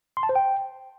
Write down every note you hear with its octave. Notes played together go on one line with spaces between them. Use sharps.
C6
A5
C5
G5